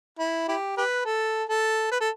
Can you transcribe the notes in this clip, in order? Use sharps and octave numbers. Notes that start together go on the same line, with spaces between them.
E4
E4 G4
G4 B4
A4
A4
B4
A4